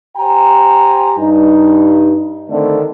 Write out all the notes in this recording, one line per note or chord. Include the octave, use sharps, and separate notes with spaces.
G4 C5 G5 G#5 A#5
G2 D#4
D3 D#3 A3 C4 D4 A4